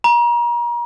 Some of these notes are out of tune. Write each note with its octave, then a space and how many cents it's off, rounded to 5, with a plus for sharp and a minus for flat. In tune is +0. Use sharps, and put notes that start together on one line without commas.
A#5 +35